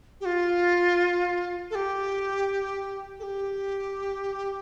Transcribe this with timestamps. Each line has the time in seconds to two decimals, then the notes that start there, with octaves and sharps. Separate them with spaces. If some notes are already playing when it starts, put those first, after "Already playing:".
0.21 G4
0.25 F4
1.71 A4
1.75 G4
3.20 A4
3.23 G4